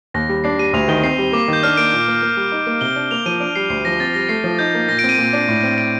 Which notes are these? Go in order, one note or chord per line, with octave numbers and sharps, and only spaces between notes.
D#2 A#6
G3
D4 C7
G3 D#7
D2 F7
D#3 G7
C4 C7
G3
A#3 D6
D#3 G6
D4 F6
A#3 D7
A#2
A#3
A#3
G3
D#4
A#3
C3 G7
D4
A#3 F7
F3 D#7
D4 D7
G3 C7
D2 C7
F3 A#6
C4 A6
G3 A#6
A3 C7
F3
D#4 G6
A#3
A#2 A#6
D7
C4
D#7
A#2
D4
A2
C4
D7